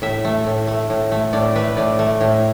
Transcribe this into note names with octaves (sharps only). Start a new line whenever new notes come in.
A2 E5
A3
A2
A3
A2
A3
A2 D5
A3 B4
A2 D5
A3
A2